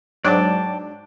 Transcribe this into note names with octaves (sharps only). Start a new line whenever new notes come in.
G#2 F#3 D4 D5 G5 A5